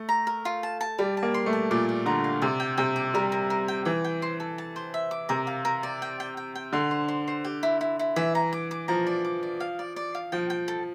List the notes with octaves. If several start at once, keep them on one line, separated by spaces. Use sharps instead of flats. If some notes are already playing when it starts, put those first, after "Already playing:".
Already playing: A3
A#5
A#4
F4
A5
A5
G3 D5
A5
A#3
C6
A3
A5
A#2 D5
D5
D3 A#5
F5
C3 D5
G5
C3 G5
D6
G3 A#4
A#4
A#4
G5
E3 G5
G5
C5
A4
A5
C5
E5
D6
C3 A#4
F5
A#4
D5
G5
G5
G5
G5
D3 C6
C5
C5
C5
G4
E4
E4
E4
E3 E5
A#5
D6
D6
F3 A#5
D5
D6
D5
F5
D5
D5
F5
F3 G5
G5
A4